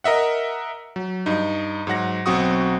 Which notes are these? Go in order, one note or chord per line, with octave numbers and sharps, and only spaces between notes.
A#4 D#5 E5 F#5
F#3
G2 D#4
G#2 F#3 F#5 A#6
B1 F#3 C4 F#4 C#6 D#6